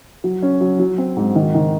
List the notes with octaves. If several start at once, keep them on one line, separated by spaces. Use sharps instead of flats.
F#3
C#4
F#3
F#3
C4
G#2
D#3
D#3